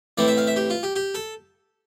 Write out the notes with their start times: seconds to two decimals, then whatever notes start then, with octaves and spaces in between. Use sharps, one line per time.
0.18 A2 E3 A3 C4 D5
0.28 E5
0.37 F5
0.47 E5
0.56 G4
0.70 F4
0.83 G4
0.96 G4
1.15 A4